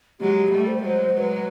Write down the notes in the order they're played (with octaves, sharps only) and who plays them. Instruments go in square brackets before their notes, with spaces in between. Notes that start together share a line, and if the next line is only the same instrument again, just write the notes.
[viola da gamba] F#3 G#3 [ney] G4
[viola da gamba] G3 A3
[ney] C5
[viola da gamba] F#3 G#3
[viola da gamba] F#3 G#3 [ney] C5
[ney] B4